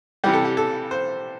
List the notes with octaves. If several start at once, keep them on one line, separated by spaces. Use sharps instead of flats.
C3 E3 G3 G4
A4
G4
A4
C5